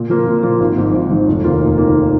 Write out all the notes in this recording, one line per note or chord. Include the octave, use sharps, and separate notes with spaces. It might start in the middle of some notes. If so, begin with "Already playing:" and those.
Already playing: A#2
F3 A#3 F4
A#2
F3 A#3 F4
G#1
G#2 F3
G#1
G#2 F3
F1
D#2 D#3 A#3 F4
F1
D#2 D#3 A#3 F4